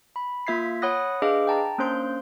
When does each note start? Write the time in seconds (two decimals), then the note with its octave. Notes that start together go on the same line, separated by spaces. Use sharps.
0.16 B5
0.47 A#3 F4 E5 G#6 B6 C7
0.82 C#5 F#5 B5 D#6 F#6 A#6
1.22 D4 G#4 B4 D#5 F5 D6
1.47 G5 A5 A#5
1.78 A#3 C#4 D4 C5 C6 G6